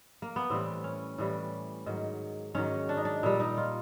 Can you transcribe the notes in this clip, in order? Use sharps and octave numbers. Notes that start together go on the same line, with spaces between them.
A#3
B3
A2 E3 G3 C4
C#4
A2 E3 G3
G#2 D#3 F#3
G#2 D#3 F#3 C#4
D4
D#4
D4
A#2 G3 D#4
D#4
F4